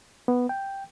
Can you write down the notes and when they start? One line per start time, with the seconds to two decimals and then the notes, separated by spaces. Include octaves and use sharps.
0.28 B3
0.49 G5